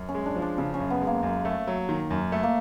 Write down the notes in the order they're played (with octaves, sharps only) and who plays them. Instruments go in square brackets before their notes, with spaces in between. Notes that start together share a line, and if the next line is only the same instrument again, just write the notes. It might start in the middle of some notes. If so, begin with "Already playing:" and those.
Already playing: [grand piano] F#2
[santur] C#4
[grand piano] G#3
[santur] D4
[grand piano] F3
[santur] D4
[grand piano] C#3 [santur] C#4
[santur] C#4
[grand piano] F#2
[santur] B3
[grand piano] G#3
[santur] A#3
[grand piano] F#2
A3
F#3
D#3
F#2
A3
[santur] A#3